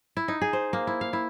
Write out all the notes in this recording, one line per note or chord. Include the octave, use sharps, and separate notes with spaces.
E4
D#4
G#4
C5
A#3
E4
F5
E4